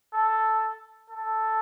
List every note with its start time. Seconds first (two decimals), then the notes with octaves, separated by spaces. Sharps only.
0.13 A4
1.10 A4